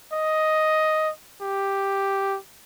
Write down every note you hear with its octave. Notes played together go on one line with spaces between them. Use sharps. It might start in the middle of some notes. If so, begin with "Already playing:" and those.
D#5
G4